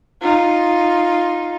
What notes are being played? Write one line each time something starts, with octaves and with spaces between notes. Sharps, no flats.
D#4 F4